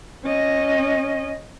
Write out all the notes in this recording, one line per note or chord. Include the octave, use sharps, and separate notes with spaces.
C#4 D#5